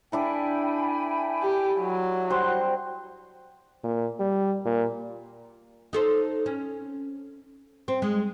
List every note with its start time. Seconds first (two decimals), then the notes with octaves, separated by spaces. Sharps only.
0.12 D4 E4 A4 G5 G#5 B5
1.42 G4
1.79 F#3
2.30 G3 F#4 C5 G5 C6 F#6
3.84 A#2
4.19 G3
4.65 A#2
5.93 D#4 A4 C5
6.46 C#4
7.88 C4
8.02 G#3